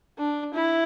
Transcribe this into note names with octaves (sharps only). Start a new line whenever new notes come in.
D4
E4